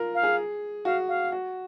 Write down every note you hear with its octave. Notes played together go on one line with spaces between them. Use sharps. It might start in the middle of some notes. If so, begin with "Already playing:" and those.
Already playing: F4 A#4
F5
G#4
F#4 F5
F5
F#4